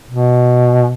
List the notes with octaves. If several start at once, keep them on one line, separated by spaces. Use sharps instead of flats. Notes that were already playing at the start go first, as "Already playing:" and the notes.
B2